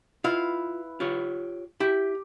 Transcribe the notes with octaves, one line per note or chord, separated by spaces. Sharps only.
E4 F4 B4 F5
F4 G4 C#5
E4 G4